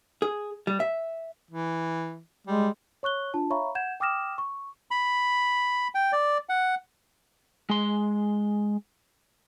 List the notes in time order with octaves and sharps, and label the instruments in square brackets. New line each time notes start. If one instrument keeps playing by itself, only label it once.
[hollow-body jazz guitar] G#4
G3
E5
[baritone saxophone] E3
[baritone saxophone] G3 [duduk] G#3
[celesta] C#5 C#6 F#6 G7
D4 F4 A5
C#5 E5 F5 A#5 B5 C#6
F#5 G6 G#6 E7
G5 D6 D#6 F6 A#6 E7
C#6
[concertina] B5
G5
D5
F#5
[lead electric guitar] G#3 C6